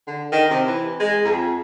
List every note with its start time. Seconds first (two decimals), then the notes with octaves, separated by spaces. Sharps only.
0.07 D3
0.32 D#3
0.50 C3
0.67 E3
1.00 G#3
1.24 F2